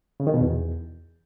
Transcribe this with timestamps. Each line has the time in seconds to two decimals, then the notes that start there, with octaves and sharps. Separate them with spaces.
0.20 C#3
0.27 D#3
0.34 B2
0.41 E2